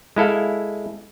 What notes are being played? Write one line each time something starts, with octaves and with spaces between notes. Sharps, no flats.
G#3 E4 A4 F5